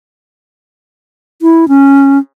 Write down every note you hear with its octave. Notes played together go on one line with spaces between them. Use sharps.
E4
C#4